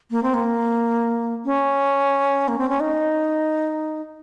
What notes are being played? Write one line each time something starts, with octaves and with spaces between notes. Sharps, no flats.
A#3
C4
A#3
C#4
A#3
C4
C#4
D#4